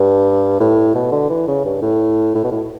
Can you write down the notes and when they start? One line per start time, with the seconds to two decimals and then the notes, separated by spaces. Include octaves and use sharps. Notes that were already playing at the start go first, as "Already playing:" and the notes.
Already playing: G2
0.60 A2
0.95 B2
1.12 D3
1.30 E3
1.48 C#3
1.65 G2
1.82 A2
2.35 A2
2.44 B2
2.52 A2